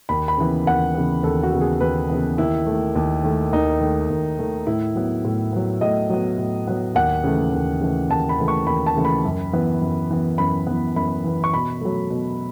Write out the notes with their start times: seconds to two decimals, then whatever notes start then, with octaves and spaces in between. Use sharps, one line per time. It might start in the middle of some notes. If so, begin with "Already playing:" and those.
0.09 D#2 B5
0.28 B5
0.38 C#3 E3 B3
0.66 D#2 F#5
0.95 C#3 E3 B3
1.23 D#2 A4
1.43 F#4
1.52 C#3 E3 B3
1.61 G#4
1.80 D#2 B4
2.10 C#3 E3 B3
2.38 D#2 E4
2.66 D#3 A3
2.95 D#2
3.24 D#3 A3
3.53 D#2 D#4
3.81 D#3 A3
4.10 D#2
4.39 D#3 A3
4.67 A2 E4
4.95 F#3 B3
5.25 A2
5.53 F#3 B3
5.81 A2 D#5
6.10 F#3 B3
6.38 A2
6.67 F#3 B3
6.95 D#2 F#5
7.24 C#3 E3 A3
7.53 D#2
7.81 C#3 E3 A3
8.09 D#2 A5
8.29 B5
8.39 C#3 E3 A3
8.48 C#6
8.67 D#2 B5
8.86 A5
8.96 C#3 E3 A3
9.05 B5
9.25 F#2
9.53 E3 B3
9.81 F#2
10.11 E3 B3
10.38 F#2 B5
10.67 E3 B3
10.96 F#2 B5
11.24 E3 B3
11.44 C#6
11.53 B2 B5
11.81 F#3 A3
12.10 B2